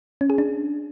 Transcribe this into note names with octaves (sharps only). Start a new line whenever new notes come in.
C#4
G#4
D4